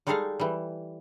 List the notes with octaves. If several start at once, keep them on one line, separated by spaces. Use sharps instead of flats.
G3 G#3 D#4 G#4 A4 F5
E3 G3